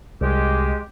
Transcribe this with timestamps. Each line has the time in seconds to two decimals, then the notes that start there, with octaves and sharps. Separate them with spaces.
0.21 C2 G#3 G4